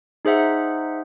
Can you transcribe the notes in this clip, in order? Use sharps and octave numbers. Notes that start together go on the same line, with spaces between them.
D#4 G#4 C5 E5 F#5